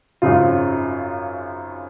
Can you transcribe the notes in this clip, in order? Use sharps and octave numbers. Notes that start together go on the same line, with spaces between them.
G#1 F#2 C#3 F4